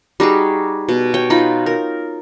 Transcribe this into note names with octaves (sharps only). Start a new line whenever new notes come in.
G3 D#4 F#4 G#4
B2
C#5 G5
D#4 F4 B5
A#4